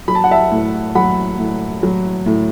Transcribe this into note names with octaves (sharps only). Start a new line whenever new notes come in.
F#3 B5
A5
F#5
E5 A5
A2
F#3 F#5 B5
A2
F#3
A2